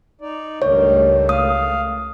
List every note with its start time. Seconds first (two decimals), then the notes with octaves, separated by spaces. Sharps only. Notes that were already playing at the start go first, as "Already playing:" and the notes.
0.21 D#4 D5
0.62 C#2 G2 D#3 A3 C#5
1.29 F5 D#6